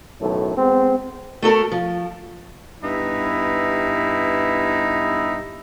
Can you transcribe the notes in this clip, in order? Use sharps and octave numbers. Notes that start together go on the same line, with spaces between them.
B1 F#2 A2 D#3 A3
G#3 B3 C4
A3 F#4 A4 A#4
F3
G2 B3 D#4 E4